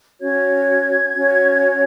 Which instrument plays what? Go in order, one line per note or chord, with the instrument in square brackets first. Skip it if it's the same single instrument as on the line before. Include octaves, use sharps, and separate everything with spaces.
[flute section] C#4 F#4 C#5 G#6
C#4 F#4 C#5